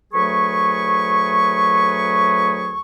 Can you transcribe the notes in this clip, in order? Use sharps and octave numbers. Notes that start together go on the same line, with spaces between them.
D2 F#3 A3 G#4 B4 C#6